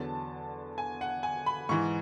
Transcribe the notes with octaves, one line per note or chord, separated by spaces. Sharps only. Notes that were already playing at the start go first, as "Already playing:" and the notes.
Already playing: E2 D3 F#3 A5
G#5
F#5
G#5
B5
G#2 E3 C#6